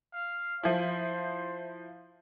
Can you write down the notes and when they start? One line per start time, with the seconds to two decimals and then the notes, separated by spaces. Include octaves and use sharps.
0.14 F5
0.63 F3 E4 C5